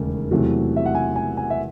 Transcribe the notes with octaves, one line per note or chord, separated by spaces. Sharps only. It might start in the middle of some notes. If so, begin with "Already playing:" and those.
Already playing: E1 D#2 C#3 A3
E2 C3 F#3 A3
E5
F#5
G#5
G#5
G#5
E5